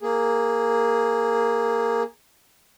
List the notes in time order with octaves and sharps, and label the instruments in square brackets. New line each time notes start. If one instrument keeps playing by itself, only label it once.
[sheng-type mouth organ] A#3 G#4